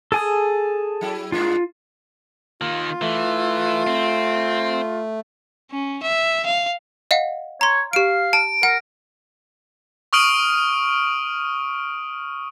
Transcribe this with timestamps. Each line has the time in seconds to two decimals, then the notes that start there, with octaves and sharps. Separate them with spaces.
0.12 G#4 A4 G#5 D#6
1.01 F#3 E4
1.32 G2 A#3 D4 F4
2.61 D#3 A#3 F4
3.01 E3 A3
3.87 C4
5.71 C#4
6.02 E5
6.46 F5
7.11 D#5 F5 F#5
7.61 C#5 A#5 C6
7.93 G4 F5 D7
8.33 A5 D7
8.63 A#4 F#5
10.13 C#6 D#6 F6 D7 D#7 F#7